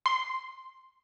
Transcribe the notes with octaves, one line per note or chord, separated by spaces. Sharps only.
C6